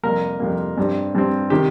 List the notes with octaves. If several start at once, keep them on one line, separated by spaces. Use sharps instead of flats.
F2 C3 G3 A#3 A#4
F2 C3 G3 A#3
G2 G3 C4
G2 G3 C4
C3 D#3 G4